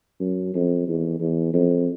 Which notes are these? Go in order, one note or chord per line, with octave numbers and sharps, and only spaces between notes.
F#2
F2
E2
E2
F2